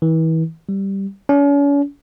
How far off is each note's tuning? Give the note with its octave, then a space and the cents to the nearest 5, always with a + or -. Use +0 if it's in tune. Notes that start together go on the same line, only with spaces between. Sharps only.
E3 -35
G3 -5
C#4 +40